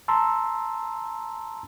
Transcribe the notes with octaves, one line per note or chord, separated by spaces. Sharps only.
A5 A#5 C6 E6